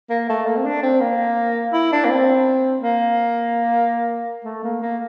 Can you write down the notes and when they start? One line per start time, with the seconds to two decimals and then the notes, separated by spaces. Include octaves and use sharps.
0.10 A#3
0.29 A3
0.46 A#3
0.57 C4
0.65 D4
0.83 C4
1.01 A#3
1.73 E4
1.92 D4
2.05 A#3
2.10 C4
2.82 A#3
4.45 A3
4.64 A#3
4.82 A#3